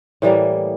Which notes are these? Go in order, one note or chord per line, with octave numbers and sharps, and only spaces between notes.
A2 E3 G3 A#3